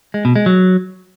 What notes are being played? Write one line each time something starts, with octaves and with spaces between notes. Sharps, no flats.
G#3
B2
G#3
F#3